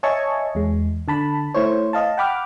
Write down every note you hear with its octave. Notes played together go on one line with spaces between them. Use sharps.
C#5 D#5 E5 G#5 A5 C#6
E2 G#3
D3 A5 B5
A3 E4 C5 C#5
D#5 F5 A5
F#5 G5 B5 D6 F6